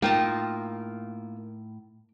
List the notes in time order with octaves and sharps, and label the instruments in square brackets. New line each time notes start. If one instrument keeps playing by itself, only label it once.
[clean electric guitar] A2 [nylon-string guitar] A#3 [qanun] D#4 F4 A5 [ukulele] G5